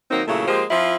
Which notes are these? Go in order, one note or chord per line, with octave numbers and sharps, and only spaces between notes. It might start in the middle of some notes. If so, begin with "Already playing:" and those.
D#3 F#3 A#3 C4 D#4
A#2 C#3 F#3 A3 E4
F3 G#3 A#3 G4 C5
F3 C4 E4 F4